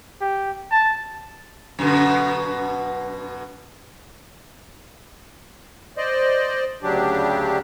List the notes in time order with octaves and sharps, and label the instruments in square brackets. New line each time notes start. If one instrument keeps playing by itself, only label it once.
[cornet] G4
A5
[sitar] F#2 B2 D3
[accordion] C5 D5 D#5
D2 C#3 F#3 D4 G4